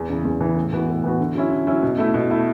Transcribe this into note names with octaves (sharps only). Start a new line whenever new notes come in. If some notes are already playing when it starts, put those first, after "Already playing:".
Already playing: E2
C#3 E3
E2
C#3 E3
A2
E3 B3 F#4
A2
E3 B3 F#4
D3
F#3 C#4 E4
D3
F#3 C#4 E4
B2
A3 E4
B2
A3 E4